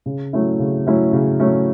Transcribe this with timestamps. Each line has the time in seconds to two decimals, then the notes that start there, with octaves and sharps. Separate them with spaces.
0.06 C#3
0.33 F#3 A3 C#4 E4
0.59 C#3
0.86 F#3 A3 C#4 E4
1.13 C#3
1.40 F#3 A3 C#4 E4